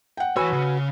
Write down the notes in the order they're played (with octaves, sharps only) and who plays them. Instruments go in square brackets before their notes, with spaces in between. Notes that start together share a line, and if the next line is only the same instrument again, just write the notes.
[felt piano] F#5 G5
[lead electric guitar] E3 C#5 [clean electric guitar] F#4 B4 [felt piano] G#5 E6
[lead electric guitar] C#3